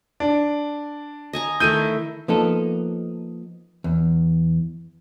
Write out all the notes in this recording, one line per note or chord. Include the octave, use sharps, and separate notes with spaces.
D4
D#5 G#5 A#5
D#3 A3 E4 G6 D#7
F3 A#3 B3 D#4 A4
E2